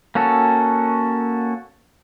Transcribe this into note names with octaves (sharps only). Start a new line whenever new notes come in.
A#3 C#4 F#4 A4